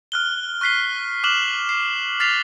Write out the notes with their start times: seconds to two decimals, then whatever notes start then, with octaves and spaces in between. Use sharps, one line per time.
0.12 F6 F#6 G7
0.61 C#6 F#6 B6 C7 G7
1.24 D6 F6 F#6 E7 F#7 G7
1.69 C7
2.20 F6 A6 B6 C7 F7